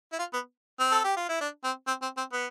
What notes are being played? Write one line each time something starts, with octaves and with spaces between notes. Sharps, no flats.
E4
F4
B3
C4
A4
G4
F4
E4
D4
C4
C4
C4
C4
B3